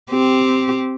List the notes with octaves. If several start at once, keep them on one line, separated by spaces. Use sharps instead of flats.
C4 G4